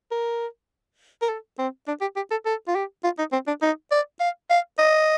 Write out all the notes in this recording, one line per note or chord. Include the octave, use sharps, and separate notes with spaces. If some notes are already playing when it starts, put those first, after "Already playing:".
A#4
A#4
A4
C4
D4
G4
G4
A4
A4
F4
G4
F4
D#4
C4
D4
D#4
D5
F5
F5
D#5